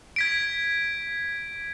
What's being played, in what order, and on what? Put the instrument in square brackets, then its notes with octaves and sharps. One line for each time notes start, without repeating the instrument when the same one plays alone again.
[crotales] G#6 B6 D7